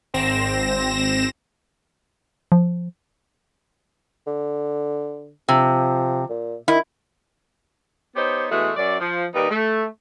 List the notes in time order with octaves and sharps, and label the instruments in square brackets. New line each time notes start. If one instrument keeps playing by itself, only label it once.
[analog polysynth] G#1 C4 A#6 E7
[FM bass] F3
[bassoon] D3
[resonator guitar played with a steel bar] C3 [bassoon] F3
[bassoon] A#2
[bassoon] D#3 [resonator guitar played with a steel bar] E4
[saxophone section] B3 D#4 G4 C5 C#5
E3 G#3 A3 B3 F#4
F#2 D5
F3
D#2 G3 D#4 B4 D#5
A3